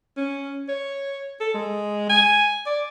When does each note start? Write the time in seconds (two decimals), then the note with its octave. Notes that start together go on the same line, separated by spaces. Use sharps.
0.17 C#4
0.69 C#5
1.40 A4
1.54 G#3
2.09 G#5
2.66 D5